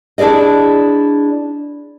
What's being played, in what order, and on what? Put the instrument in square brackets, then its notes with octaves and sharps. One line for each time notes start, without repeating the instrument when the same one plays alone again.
[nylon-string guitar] D4 E4 G#4 D5 D#5